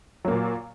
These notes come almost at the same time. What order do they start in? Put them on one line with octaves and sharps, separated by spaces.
F#3 A#3 A#2